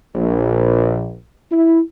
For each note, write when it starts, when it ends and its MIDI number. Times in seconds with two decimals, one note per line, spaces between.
0.15 1.14 34
1.51 1.79 64